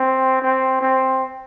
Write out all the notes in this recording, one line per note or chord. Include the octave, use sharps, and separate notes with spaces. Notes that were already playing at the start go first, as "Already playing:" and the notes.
Already playing: C4
C4
C4